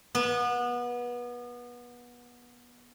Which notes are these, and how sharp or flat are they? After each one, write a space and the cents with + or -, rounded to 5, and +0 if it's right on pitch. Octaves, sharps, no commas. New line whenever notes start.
B3 -25